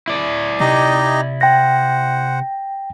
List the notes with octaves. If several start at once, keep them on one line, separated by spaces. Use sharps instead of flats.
E4 D5
C3 D#4 G4 D#5
C5 F#5 G5 A#6